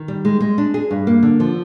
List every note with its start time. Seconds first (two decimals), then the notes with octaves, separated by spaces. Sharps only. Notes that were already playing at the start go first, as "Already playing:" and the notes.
Already playing: D#3
0.08 G3
0.25 G#3
0.41 G#3
0.58 D4
0.74 G#4
0.91 G2
1.07 A#3
1.23 D3
1.40 F3